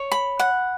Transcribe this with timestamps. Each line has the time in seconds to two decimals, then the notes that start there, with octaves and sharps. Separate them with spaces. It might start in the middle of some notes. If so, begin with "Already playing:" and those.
Already playing: C#5
0.12 B5
0.39 F#5